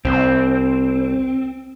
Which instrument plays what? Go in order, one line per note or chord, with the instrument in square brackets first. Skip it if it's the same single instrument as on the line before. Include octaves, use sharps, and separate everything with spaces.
[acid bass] C2 [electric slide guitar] C4